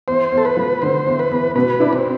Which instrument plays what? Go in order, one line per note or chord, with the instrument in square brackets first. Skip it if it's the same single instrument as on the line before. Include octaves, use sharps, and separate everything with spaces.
[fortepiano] E2 [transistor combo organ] C5
[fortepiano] E2
[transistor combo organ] A4
B4
[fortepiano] F3
[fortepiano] D3 [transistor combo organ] C5
[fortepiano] E2
[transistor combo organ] B4
[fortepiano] E2
[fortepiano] B2 [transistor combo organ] B4
[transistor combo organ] D4 [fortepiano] E4
[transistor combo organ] C4